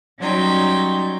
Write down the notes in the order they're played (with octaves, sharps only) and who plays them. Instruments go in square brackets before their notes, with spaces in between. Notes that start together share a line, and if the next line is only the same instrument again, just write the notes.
[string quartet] F#3 G3 C#4 D#4 G5 C6